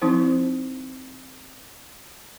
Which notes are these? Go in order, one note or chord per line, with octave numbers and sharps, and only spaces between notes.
F3 C4 D#4 E4 C5